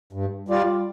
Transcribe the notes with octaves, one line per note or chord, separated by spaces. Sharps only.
G2
G3 F4 D5